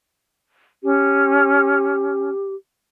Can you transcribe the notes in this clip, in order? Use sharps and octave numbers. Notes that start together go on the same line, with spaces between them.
C#4 G4